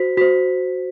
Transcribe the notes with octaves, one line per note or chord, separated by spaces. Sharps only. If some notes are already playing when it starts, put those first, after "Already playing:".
Already playing: F#4 C5 B6
F#4 C5 B6